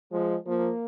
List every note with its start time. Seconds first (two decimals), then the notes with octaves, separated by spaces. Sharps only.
0.12 F3 G#3
0.46 F3 A#3